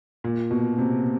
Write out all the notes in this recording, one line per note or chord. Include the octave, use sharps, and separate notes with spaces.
A#2
B2
C3